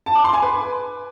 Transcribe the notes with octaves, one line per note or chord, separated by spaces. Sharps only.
A5
D6
C6
G#5
B4